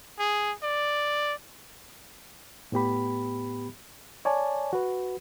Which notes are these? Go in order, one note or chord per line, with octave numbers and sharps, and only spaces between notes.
G#4
D5
A2 B3 G4 B5
C#5 D5 G#5 A5
F#4 B4